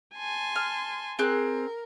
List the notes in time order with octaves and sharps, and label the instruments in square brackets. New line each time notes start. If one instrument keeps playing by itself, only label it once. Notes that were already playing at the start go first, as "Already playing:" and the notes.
[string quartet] G#5 A5 C6
[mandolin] F6
[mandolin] C4 G#4 F#6 [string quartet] A#4